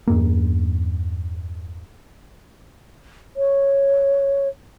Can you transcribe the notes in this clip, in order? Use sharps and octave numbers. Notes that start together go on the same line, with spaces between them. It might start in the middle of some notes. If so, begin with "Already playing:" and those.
E2 G2 A#3
C#5